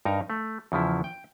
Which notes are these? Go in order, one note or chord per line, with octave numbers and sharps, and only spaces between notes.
G2 D#4 A#4 A#5
A3
E2 C#3 F3 E4
G5